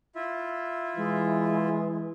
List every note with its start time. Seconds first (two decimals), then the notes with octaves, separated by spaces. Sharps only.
0.15 E4 F4 E5
0.97 E3 G#3